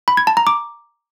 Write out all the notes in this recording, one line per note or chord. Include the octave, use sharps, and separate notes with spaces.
B5
G#6
A5
A#5
D6